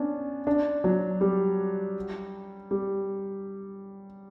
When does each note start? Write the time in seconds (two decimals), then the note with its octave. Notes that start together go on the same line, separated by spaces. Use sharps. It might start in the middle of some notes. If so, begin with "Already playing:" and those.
Already playing: B3 C#4 D4
0.47 D4
0.84 F#3
1.21 G3
2.71 G3